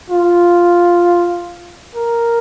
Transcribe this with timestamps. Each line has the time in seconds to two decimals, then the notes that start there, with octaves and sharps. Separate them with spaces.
0.10 F4
1.95 A#4